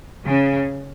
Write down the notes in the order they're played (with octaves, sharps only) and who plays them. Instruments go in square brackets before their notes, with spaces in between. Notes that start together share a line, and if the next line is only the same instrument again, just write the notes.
[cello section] C#3